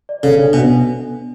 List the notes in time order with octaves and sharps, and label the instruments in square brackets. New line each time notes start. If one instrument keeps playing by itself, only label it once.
[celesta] D5
[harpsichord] C#3 [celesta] A4
[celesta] D4
[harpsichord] B2 [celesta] G#5